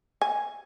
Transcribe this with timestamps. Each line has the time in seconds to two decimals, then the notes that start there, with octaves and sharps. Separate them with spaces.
0.22 G#5